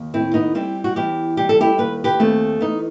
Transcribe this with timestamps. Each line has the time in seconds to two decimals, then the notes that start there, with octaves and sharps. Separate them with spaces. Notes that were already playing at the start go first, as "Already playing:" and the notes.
Already playing: D#2
0.14 A2 C4 E4
0.34 B3 D#4
0.55 G3 C4 E4
0.84 F#4
0.96 E2 E4 G4
1.37 G3 G4
1.49 A4
1.61 E4 G4
1.78 D#2 B4
2.04 G4 B4
2.19 D#2 A3 C4
2.61 E2 B3 D#4